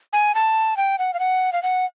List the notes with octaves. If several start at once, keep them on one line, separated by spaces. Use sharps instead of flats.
G#5
A5
G5
F#5
F5
F#5
F5
F#5